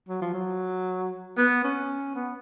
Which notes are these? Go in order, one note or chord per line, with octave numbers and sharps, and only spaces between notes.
F#3
F3
F#3
B3
C#4
B3